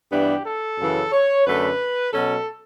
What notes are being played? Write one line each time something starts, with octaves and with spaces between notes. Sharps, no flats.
G2 E3 B3 D4 G4
A4
F#2 C#3 E3
C#5
F#2 D3 A3 B4
B2 F#3 C#4 A4